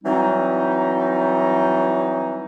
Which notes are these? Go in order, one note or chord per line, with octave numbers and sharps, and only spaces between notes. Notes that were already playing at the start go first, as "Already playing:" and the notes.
E3 F#3 G3 C4 D#4